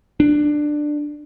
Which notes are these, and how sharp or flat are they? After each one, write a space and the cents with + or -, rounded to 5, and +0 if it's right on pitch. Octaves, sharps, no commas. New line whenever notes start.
D4 +15